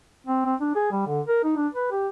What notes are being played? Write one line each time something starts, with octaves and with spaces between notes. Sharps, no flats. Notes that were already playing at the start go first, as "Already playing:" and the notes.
C4
C4
D4
G#4
G3
D3
A#4
D#4
D4
B4
G4